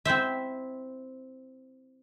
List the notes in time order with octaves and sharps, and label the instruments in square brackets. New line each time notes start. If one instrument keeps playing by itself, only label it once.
[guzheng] C4 E4 C5 E5